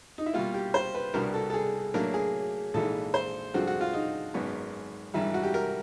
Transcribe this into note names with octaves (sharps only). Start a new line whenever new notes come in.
D#4
E4
B2 G3 A#3 F4
G4
C5
B4
C2 B2 G3 B3 D4 A#4
A4
A4
G#4
A2 F#3 A#3 D4 A#4
G#4
A#1 G#2 E3 G#3 A4
C5
G2 D3 F3 G#3 C4 F#4
F#4
F4
D#4
G#1 F#2 D#3 G#3 B3
G#1 G2 E3 G3 E4
F#4
G4
A#4